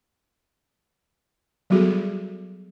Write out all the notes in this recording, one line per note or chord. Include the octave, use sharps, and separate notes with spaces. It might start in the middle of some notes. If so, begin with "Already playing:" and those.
F#3 G3 B3 F#4 G#4 A4